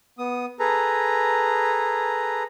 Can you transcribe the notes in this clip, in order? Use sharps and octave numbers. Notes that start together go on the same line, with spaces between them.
B3 D#6
G#4 A4 B4 A#5